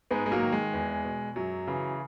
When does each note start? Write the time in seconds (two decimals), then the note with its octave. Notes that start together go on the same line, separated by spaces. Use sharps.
0.11 G#2 G#3 B3
0.26 G#3
0.32 F#3 A#3
0.42 D#3
0.52 G#3
0.73 E2
1.05 B2
1.36 F#2 F#3
1.67 C#3 E3